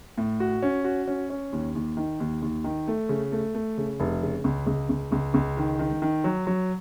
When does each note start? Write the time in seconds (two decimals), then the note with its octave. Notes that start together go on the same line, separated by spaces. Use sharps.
0.18 A2
0.40 F#4
0.62 C#4
0.84 F#4
1.08 C#4
1.30 C#4
1.53 D#2
1.75 D#2
1.97 D#3
2.20 D#2
2.42 D#2
2.64 D#3
2.88 A3
3.09 C#3
3.32 A3
3.55 A3
3.78 C#3
4.00 F1
4.22 C#3
4.44 C#2
4.67 C#2
4.89 C#2
5.12 C#2
5.34 C#2
5.57 D#3
5.79 D#3
6.02 D#3
6.24 F#3
6.47 F#3